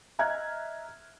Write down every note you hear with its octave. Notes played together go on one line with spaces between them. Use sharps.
D#5 E5 A#5 F6 F#6 G#6